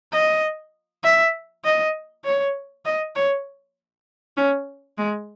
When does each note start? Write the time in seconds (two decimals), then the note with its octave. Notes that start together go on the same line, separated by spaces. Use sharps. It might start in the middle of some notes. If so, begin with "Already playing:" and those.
0.12 D#5
1.03 E5
1.64 D#5
2.25 C#5
2.85 D#5
3.16 C#5
4.37 C#4
4.98 G#3